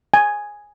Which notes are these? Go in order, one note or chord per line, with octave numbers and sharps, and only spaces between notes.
G#5